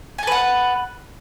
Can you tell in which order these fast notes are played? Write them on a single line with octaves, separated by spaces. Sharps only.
G#5 A4 B4 F#5